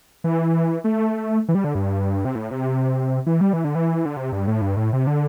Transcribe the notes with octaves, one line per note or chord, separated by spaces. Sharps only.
E3
A3
E3
G3
D3
G2
C3
A2
C3
E3
G3
E3
D3
E3
D3
C3
G2
A2
G2
A2
C3
D3